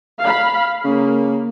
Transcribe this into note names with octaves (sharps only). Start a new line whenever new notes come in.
F5 B5
C#3 A#3